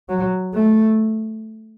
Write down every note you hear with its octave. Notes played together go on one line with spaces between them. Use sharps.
F#3
A3